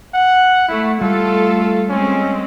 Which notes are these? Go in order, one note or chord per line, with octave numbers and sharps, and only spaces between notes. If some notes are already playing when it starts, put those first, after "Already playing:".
F#5
A3 E4
G3 A3 F4 A4
G#3 C4 C#4